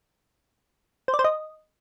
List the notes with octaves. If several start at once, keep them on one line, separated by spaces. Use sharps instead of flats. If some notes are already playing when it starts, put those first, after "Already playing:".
C5
D5
C5
D#5